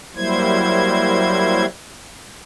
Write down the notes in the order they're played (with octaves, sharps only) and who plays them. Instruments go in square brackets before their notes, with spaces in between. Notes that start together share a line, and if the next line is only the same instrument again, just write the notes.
[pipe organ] F#3 G3 A#3 E4 C5 G#6